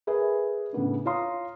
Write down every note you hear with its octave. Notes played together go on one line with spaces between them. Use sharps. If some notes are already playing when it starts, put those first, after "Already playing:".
G#4 A#4 B4 E5
A2 C#3 B3 D4
F4 C#5 F5 A#5 C6 D#6